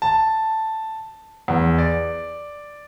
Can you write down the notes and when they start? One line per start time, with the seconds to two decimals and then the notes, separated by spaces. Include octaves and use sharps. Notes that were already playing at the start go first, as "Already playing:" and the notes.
0.02 A5
1.48 E2
1.78 D5